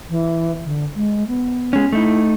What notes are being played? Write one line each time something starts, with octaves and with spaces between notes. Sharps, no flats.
E3
D3
G#3
B3
G#3 C#4
A3 D#4 E4